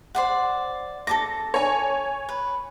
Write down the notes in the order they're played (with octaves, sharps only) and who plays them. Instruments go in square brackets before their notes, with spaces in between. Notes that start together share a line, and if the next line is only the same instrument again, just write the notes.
[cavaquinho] C5 D5 F#5
[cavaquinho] A4 A5 D6 [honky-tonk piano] A#6
[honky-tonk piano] C#5 G#5
[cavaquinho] B4